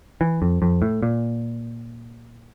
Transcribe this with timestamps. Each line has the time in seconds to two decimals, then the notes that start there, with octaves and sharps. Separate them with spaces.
0.21 E3
0.42 F2
0.62 F2
0.82 A2
1.02 A#2